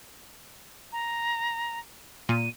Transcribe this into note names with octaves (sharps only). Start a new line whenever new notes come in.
A#5
A#2 D#7